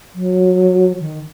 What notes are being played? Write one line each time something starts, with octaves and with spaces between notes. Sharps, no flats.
F#3
D#3